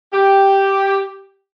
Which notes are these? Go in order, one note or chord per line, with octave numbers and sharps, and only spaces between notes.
G4